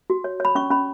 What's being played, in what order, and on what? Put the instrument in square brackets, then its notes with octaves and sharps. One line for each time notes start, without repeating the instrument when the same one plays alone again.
[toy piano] F#4
C#5
C#5 B5
C#4 C#6
C#4 B5